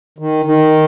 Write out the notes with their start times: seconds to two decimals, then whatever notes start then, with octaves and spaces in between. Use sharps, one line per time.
0.18 D#3
0.45 D#3